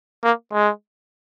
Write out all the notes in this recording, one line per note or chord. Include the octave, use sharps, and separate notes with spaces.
A#3
G#3